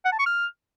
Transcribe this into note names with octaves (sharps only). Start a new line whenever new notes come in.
F#5
A5
C#6
F6